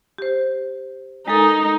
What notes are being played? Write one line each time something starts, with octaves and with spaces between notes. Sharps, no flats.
G4 C5
G#3 D#4 A4 A#4